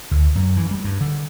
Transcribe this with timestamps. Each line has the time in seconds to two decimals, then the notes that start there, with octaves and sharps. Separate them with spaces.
0.11 D2
0.35 F#2
0.57 E3
0.71 G3
0.84 G2
1.01 D3